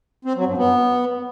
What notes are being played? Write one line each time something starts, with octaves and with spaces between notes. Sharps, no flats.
C4
F#3
G2
B3